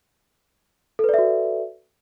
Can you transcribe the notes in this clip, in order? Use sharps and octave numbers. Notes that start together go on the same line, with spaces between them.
F#4 A4 B4 D5 E5